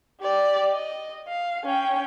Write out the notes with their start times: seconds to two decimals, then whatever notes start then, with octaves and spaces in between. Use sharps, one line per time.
0.21 G4 D5
0.73 D#5
1.28 F5
1.64 C#4 G5